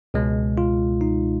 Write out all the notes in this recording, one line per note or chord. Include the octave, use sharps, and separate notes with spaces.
C#2 B2 G#3
F4
D#4